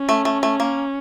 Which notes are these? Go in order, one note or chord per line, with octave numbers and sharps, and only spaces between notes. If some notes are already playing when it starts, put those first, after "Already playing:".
Already playing: C#4
A3
A3
A3
A#3